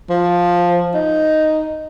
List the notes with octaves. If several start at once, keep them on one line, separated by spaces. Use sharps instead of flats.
F3
D#4